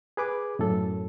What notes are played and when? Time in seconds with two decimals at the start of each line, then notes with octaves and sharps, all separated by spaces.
0.17 G#4 B4 D6
0.59 F#2 A2 A4